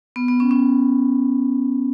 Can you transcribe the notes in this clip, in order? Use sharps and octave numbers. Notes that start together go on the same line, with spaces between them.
B3
B3
C#4
C#4